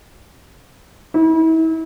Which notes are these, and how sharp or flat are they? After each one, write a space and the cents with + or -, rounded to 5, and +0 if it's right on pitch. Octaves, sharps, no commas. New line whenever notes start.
E4 -35